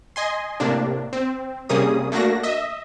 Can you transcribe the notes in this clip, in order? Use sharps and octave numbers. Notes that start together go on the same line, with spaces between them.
D#5 G#5 C6
A2 C3 A#3 D4
C4
C3 G3 A#3 C#4 G#4 D#6
A3 A#3 D4 F#4 A#6
D#5 E5